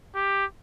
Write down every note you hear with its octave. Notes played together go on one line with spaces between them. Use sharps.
G4